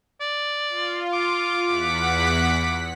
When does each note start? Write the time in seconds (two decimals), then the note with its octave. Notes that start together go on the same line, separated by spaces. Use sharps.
0.21 D5
0.69 F4
1.13 D6
1.65 E2 F#5 B6